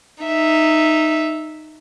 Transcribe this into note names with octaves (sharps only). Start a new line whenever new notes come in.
D#4 E5